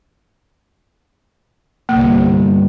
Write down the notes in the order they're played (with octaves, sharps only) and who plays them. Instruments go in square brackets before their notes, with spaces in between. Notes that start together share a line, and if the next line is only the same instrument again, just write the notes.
[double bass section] G1 C2 [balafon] A#3